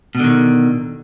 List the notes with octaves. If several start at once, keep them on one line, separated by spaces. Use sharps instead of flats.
B2 D3 D#3